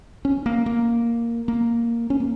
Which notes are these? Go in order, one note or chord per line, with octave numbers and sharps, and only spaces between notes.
C#4
A#3
A#3
A#3
C#4
A#3